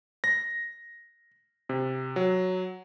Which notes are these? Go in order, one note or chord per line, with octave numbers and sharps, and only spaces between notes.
A#6
C3
F#3